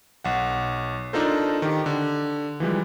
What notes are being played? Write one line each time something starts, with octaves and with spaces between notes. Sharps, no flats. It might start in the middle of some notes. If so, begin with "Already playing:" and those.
B1 F#5
D4 D#4 F4 A4 A#4 C5
D#3 G4
D3
E3 F3 G3 G#3